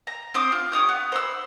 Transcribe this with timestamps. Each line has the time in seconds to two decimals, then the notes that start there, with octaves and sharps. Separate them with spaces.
0.07 A#5
0.34 C4 C5 D6 D#6
0.52 F4
0.72 G4 C#5 D#6 G6
0.89 B3
1.12 C5 B5 E6